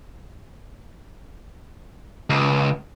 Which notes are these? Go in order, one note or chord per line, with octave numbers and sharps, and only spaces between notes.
C#2